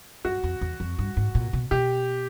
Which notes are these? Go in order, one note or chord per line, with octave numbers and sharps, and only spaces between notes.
F#2 F#4
F2
E2
F2
G2
G#2
A#2
B2
B2 G4